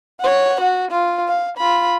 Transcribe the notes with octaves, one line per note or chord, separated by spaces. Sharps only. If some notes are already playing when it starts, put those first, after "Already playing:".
C#5 F#5
F#4
F4
F5
F4 B5